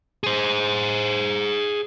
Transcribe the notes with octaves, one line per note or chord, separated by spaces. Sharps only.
G#4 C5